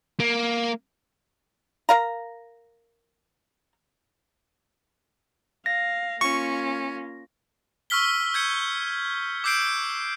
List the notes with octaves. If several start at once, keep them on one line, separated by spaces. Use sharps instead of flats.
A#3
A#4 F5 A#5
F5 A#6
A#3 C#4 F4 C#6
C#6 E6 F6 B6 G7
G6 G#6 C#7
D6 E6 G6 C7 D7